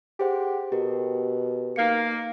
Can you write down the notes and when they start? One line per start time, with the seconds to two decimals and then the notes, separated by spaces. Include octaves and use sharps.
0.19 G4 G#4 C5 F#5
0.72 B2 G4 A4 A#4
1.76 A#3 D#4 C#7